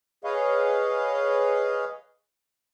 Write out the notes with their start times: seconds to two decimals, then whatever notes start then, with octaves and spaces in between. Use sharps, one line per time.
0.24 G#4 B4 C#5 D#5 F5